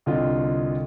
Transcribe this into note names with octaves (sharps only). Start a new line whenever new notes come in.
C2 D3 F4 D#5